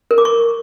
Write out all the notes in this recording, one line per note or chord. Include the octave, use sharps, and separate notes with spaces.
A#4
D6
C#6